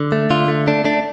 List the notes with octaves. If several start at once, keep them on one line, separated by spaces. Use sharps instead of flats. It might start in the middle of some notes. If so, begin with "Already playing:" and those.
Already playing: D3
A3
D3 F4
A3
A3 D4
A3 D4